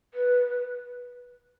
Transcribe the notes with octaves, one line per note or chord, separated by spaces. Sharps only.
B4